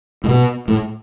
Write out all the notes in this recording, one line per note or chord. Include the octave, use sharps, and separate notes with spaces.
A2
B2
A2